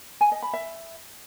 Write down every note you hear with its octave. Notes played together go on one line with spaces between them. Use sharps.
G#5
D#5
B5
E5